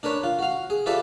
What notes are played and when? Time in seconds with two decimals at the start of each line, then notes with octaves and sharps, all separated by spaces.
0.03 D4 A#4 B4 C#5
0.24 F4
0.39 F#4 F5
0.70 G#4
0.86 F4 G4 A4 B4 D5 E5